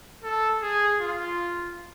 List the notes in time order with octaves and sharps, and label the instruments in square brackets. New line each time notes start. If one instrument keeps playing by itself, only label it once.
[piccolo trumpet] A4
G#4
F4